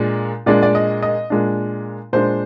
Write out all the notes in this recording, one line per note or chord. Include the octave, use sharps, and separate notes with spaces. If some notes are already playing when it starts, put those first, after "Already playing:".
Already playing: A#2 G#3 D4
A#2 G#3 D4 D5
D5
D#5
D#5
A#2 G#3 D4
A#2 G#3 D4 C5